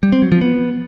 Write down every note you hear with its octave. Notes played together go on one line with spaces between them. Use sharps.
G3
C4
F#3
F3
B3